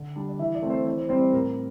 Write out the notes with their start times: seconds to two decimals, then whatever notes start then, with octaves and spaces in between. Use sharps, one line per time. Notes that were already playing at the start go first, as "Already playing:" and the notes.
Already playing: D3
0.16 G3 D4
0.28 D5
0.39 E3 E5
0.55 D5
0.62 A3 C4
0.70 C5
0.86 E3 C5
0.98 C5
1.09 G3 C4 C5
1.21 D5
1.32 A2 A#4